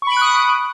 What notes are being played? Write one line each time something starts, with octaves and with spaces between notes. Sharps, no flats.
B5 C#6 D#6 F#6 D7